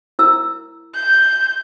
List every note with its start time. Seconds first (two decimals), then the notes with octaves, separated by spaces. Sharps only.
0.19 E4 A#4 E6
0.95 G6